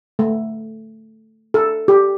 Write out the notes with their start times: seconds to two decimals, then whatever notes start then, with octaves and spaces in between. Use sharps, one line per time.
0.19 A3
1.54 A4
1.88 G4